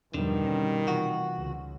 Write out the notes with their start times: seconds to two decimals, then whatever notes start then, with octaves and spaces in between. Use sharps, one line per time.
0.14 E2 G2 B2 D3 D#3 F3 G3
0.45 C#4
0.88 C3 E3 F4 F#4
1.37 C#2